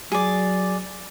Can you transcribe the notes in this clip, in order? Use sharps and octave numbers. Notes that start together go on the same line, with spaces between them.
F#3 G#4 D5